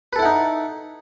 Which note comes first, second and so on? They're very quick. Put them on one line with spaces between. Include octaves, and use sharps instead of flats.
B4 A4 E4 F#5 D#4